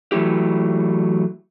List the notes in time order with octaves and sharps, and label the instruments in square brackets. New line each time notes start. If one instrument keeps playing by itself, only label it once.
[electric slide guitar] E3 F#3 A3 E4 G4